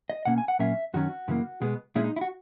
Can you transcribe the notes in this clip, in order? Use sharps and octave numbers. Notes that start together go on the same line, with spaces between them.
D#5
B2 A#3 C#4 F#5
G#5
F#5
A#2 F#3 A#3 C#4 E5
F#2 D#3 F#3 C#4 F#4
F#2 C#3 E3 A#3
B2 G#3 B3
A#2 G#3 C#4 E4
D#4
E4
F#4